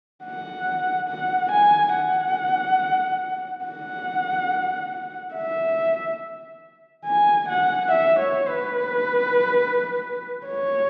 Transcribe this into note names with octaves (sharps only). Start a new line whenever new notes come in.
F#5
F#5
G#5
F#5
F#5
E5
G#5
F#5
E5
C#5
B4
C#5